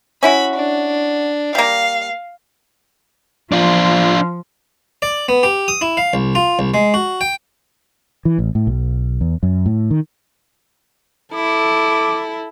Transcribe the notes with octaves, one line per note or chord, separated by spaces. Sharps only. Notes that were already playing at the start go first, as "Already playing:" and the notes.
C#4 E4 F#4 B5
D4
G3 A#3 F5
F3 D4 F4
D5
B3
G4
D#6
E4
F5
C2
F4
C2
G#3
F#4
G5
E3
A1
A2
B1
E2
F#2
A2
D#3
E4 A4 D6